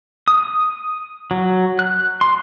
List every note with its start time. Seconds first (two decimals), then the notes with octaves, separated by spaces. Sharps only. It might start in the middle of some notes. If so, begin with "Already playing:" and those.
0.28 D#6
1.31 F#3
1.79 F#6
2.21 C6